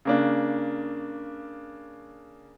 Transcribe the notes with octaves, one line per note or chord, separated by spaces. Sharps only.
C#3 A#3 D4